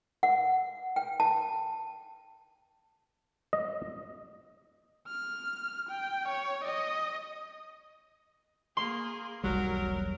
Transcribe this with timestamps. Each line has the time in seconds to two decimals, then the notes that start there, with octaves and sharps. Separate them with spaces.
0.23 F#5
0.96 G5
1.20 A5
3.53 D#5
5.08 F6
5.89 G5
6.28 C#5
6.65 D#5
8.77 A#3 G#4 C6
9.44 E1 B1 F#3 G3 A#4